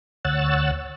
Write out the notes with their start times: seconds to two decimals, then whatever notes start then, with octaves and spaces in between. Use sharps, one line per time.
0.25 D2 C#5 F#5 E6 F#6 A6